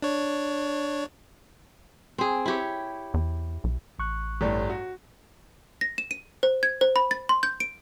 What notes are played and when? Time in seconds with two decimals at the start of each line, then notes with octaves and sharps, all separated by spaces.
0.02 D4 C#5
2.18 C4 G#4
2.46 E4 G4 C#5
3.14 E2
3.64 B1
3.99 A1 C#6 F#6
4.41 G1 A2 G3
4.70 F#4
5.81 A#6
5.98 E7
6.11 D#7
6.43 C5
6.63 G#6
6.81 C5
6.96 B5
7.11 A6
7.29 C6
7.43 G6
7.60 D7